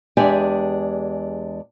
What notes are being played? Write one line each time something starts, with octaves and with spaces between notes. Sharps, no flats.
E2 G#3 D4 G4 E5 G#5